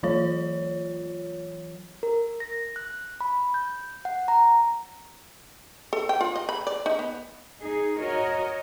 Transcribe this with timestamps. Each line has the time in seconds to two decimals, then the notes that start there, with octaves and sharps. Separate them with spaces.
0.03 E3 F#3 F4 C#5
2.03 A#4
2.40 A#6
2.76 F#6
3.21 B5
3.54 G6
4.05 F#5
4.28 A#5
5.93 A4
6.09 G5
6.21 F4
6.36 D#5
6.49 B5
6.67 D5
6.86 D#4
6.99 B3
7.60 D#4 G#4
7.99 F#4 A#4 C#5 D#5